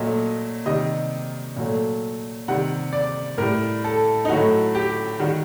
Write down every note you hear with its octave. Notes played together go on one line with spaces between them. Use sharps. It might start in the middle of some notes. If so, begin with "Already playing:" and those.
Already playing: A#2 F#3 A3 D#5
C3 D#3 G3 D#5
A#2 F#3 A3
C3 D#3 G3 F#5
D5
A2 G3 A#4
A4
D#4
A2 F#3 A3 F#4
G4
D#3 G3 F#4